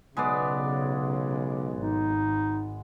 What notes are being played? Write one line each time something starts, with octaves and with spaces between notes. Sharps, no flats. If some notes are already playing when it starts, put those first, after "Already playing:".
B1 C#3 G#3 B3 D5
G#1 D#4